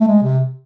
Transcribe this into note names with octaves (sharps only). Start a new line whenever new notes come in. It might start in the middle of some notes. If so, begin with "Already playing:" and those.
A3
G#3
C3